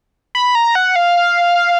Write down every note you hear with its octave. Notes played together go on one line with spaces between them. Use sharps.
B5
A#5
F#5
F5